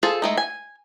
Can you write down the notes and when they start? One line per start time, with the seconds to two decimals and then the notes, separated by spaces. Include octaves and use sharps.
0.03 F4 G#4 A4 C5 A5
0.22 G#3 A3 D#4
0.37 G#5